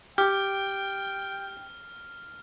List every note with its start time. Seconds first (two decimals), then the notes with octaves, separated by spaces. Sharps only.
0.18 G4 G5 F6